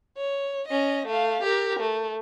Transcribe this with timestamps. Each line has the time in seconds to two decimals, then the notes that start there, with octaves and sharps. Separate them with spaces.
0.17 C#5
0.68 C#4 D#5
1.07 A3 F5
1.43 G4 A#4
1.80 A3